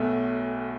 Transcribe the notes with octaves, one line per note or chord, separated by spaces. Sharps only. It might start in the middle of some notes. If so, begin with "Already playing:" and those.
Already playing: B1 B2 A3 E5